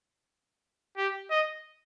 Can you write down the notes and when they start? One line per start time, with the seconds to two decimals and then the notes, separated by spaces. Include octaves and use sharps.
0.97 G4
1.31 D#5